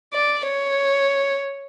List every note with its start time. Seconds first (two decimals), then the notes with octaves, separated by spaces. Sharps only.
0.14 D5
0.48 C#5